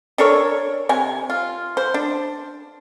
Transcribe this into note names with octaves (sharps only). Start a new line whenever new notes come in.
D4 A4 A#4 C#5
C3 G#5
F4
C5
D4